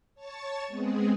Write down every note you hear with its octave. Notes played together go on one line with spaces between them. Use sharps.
C#5 A5 C#6 A6
G#3 B3 C4 G#4